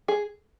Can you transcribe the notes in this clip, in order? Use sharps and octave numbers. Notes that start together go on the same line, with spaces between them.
G#4